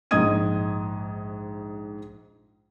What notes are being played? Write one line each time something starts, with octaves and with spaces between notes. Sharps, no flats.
A#1 G#2 D#5 D#6 G#6 D#7